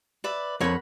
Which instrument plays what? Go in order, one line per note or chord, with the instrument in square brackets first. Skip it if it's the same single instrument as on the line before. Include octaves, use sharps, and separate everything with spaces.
[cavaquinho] B4 D5 E5
[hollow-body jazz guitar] F2 C#5 [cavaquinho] A#4 F#5 B5